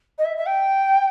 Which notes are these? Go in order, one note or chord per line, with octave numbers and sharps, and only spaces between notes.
D#5
E5
E5
G5